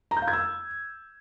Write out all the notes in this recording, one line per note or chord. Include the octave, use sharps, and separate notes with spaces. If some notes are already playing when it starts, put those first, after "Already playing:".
A#5
G6
F5
G#6
E6